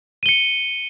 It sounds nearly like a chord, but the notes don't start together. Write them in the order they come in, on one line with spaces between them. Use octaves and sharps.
D#7 G7 C#7